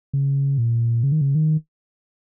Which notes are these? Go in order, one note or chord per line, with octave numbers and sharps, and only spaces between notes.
C#3
A#2
C#3
D#3
C#3
D#3